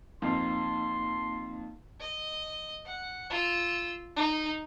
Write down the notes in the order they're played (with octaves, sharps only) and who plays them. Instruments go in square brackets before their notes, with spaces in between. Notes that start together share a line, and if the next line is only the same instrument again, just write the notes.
[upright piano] F2 C4 [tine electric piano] A#3 D#4 F5 [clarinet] C6
[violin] D#5
F#5
F4 E6
D#4